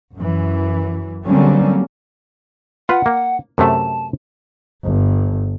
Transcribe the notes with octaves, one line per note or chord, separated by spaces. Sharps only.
F#2 E3
D3 F#3 G3 A#3 C4 C#4
F4 B4 F#5
A#3
F#2 C3 A3 A5
G1